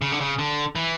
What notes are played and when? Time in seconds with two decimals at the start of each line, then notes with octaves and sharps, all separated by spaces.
0.02 C#3
0.12 D3
0.21 C#3
0.39 D3
0.76 E3